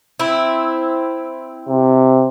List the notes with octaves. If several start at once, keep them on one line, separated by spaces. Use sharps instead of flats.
C4 E4
C3